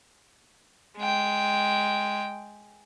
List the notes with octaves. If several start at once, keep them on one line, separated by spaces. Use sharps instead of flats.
G#3 G5